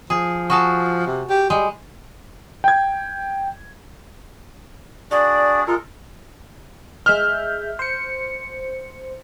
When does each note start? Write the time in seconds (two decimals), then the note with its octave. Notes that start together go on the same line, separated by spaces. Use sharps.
0.10 F3 G#4
0.50 F#4 G#4 A4
1.07 C3
1.30 G4
1.50 G3 G#3
2.64 G5 G#6
5.11 D4 F#4 G#4 D5
5.67 G#3 F4 A4 A#4
7.06 G#3 E5 F6 G6
7.79 C5 C#7